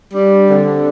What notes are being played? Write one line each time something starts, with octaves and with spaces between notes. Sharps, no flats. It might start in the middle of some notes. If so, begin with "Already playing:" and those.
G3 D4
D3 C4
G3